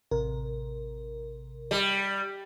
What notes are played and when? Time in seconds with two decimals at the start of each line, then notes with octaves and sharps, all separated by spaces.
0.11 A1 C3 A#4
1.71 G3